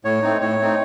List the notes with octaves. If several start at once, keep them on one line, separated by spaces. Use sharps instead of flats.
A2 C#5
A3 C4 D#4
A2 C#5
A3 C4 D#4